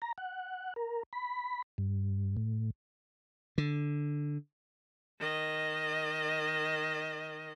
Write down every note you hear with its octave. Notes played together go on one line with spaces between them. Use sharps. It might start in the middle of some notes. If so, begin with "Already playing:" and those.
A#5
F#5
A#4
B5
G2
A2
D3
D#3 D#5